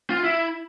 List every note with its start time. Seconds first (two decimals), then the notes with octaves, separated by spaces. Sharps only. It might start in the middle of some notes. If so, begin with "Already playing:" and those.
0.10 F4
0.24 E4